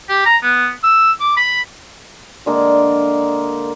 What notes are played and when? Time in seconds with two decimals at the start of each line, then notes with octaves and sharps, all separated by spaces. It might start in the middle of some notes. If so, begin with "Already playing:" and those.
0.09 G4
0.26 A#5
0.43 B3
0.83 E6
1.20 D6
1.37 B5
2.46 D3 G#3 A#3